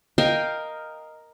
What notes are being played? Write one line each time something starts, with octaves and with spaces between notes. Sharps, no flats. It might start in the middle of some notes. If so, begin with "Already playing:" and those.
A#4 D#5 F5 G5